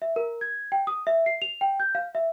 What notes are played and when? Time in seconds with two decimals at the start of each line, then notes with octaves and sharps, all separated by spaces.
0.02 E5
0.16 A#4
0.41 G#6
0.72 G5
0.87 D#6
1.07 E5
1.26 C7
1.42 F7
1.61 G5
1.80 G6
1.95 F5
2.15 E5